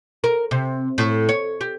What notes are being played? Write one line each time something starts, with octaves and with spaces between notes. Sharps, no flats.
A#4
C3
A2
C#5
G4